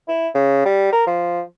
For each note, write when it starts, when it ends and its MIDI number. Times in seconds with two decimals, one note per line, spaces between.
0.08 0.28 64
0.35 0.62 49
0.65 0.88 55
0.92 1.03 70
1.07 1.41 53